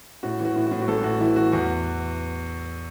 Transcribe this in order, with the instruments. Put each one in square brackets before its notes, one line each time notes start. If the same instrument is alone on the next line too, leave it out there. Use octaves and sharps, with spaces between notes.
[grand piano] A2 F#4
E3
F#4
A2
F#4
A2
F#4
A1 A4
A2 F#4
E3 E4
E3 F#4
E2 F#4